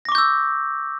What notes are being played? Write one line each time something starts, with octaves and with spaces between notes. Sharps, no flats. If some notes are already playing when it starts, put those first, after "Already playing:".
C#6 D6 E6 G6 A#6